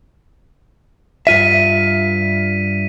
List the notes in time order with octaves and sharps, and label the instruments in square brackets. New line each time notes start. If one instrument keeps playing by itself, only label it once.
[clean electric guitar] G2 F4 E5 [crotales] B6 D#7